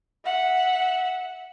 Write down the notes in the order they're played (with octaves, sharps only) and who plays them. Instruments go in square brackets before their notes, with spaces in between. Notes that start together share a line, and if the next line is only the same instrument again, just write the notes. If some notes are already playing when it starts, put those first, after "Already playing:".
[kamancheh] E5 F#5